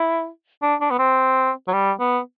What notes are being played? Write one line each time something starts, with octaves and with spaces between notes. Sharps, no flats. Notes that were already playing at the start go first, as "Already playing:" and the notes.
Already playing: E4
D4
D4
B3
C4
F#3
G3
B3